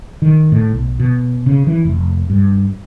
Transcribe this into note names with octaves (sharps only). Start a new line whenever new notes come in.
D#3
A2
B1
B2
C#3
E3
F1
G2